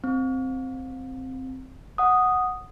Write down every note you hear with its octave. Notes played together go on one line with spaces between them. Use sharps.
C4
F#5 D#6